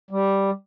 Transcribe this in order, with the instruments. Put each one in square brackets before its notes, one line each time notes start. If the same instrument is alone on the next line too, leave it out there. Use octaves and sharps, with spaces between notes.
[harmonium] G3